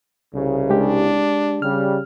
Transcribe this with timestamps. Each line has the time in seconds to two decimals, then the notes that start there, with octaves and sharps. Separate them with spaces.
0.34 C2 C#3
0.70 G#3 D4 G4
1.62 C#3 G3 F6